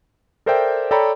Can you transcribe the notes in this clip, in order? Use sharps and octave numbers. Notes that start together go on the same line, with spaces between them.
A4 A#4 C5 D5 E5 G5
A4 C#5 D5 G5 A#5 B5